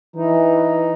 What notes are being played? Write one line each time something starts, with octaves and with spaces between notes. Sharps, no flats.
E3 D#4